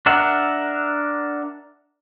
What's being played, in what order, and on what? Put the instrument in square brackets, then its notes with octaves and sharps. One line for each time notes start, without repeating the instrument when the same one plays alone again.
[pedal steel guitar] D4 A#4 E5 F#5